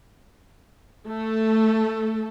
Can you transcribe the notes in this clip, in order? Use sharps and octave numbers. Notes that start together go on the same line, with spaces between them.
A3 A4